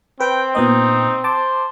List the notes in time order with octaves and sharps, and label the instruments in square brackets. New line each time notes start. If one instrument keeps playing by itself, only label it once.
[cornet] C4 [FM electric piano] B4 [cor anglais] G5
[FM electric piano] A#2 B3 D#5 [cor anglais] D#4
[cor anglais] C5 [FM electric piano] A5 D6